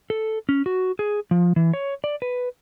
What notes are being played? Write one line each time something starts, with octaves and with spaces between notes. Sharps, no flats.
A4
C#4
F#4
G#4
F3
E3
C#5
D5
B4